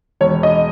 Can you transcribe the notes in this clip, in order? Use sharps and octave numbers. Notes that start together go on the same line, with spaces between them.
E1 C#5
D#5